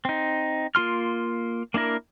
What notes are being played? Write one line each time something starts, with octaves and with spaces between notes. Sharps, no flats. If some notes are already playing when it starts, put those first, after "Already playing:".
C4 D#4
A#3 F4 C6 F6
A#3 D4 E4 A#4